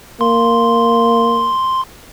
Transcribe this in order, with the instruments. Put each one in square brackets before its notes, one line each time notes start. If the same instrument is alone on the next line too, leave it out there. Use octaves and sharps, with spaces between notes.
[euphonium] A#3 [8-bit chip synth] C6